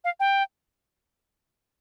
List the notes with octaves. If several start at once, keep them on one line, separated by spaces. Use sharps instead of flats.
F5
G5